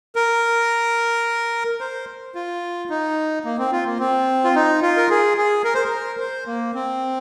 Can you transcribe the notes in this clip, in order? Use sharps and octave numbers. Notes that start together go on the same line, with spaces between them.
A#4
C5
F4
D#4
A#3
C4
F4
A#3
C4
F4
D#4
F4
A#4
G#4
G#4
A#4
C5
A#4
C5
A#3
C4